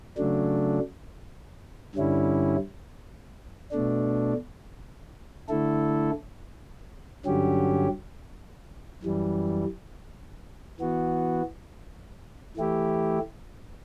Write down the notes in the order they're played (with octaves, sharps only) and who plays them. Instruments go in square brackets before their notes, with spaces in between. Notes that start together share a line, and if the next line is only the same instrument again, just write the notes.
[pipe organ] C#3 F#3 A3 D4
G2 D3 G3 C#4 E4
B2 A3 D4
D3 A3 E4 A4
G2 D3 F#3 C#4 G4
F#2 E3 G3
E3 B3 F#4
E3 A3 E4 G4